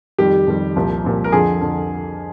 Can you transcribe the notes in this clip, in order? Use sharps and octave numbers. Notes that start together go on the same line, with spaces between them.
F2 D#3 G3 G4
F2 D#3 G3
C2 A#2 F3
C2 A#2 F3
A#4
F2 D3 F3 G#4
F2 D3 F3